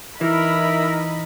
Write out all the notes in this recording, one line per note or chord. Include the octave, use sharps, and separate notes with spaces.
E3 D#4 E4 A#4 B5